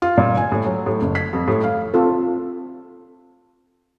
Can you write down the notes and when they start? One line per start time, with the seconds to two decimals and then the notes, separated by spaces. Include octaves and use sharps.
0.02 F4
0.18 A#2
0.37 G#5
0.52 A2
0.66 F#3
0.86 A2
1.02 F#1
1.15 B6
1.33 F2
1.48 A2
1.64 F5
1.94 C4 F4 A4